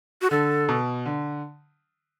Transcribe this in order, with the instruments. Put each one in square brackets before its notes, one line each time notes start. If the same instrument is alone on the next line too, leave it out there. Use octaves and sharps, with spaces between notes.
[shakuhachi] F#4
[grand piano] D3 [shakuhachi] A4
[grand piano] B2
D3